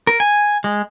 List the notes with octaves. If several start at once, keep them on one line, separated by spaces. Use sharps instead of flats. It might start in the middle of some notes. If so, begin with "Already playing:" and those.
A#4
G#5
G#3